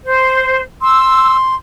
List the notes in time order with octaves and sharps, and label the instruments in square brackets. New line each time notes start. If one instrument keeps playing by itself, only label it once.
[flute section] C5
[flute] C6 [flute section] E6